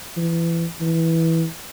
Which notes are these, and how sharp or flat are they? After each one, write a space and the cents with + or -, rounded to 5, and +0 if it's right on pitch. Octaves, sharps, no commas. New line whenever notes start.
E3 +25
E3 -10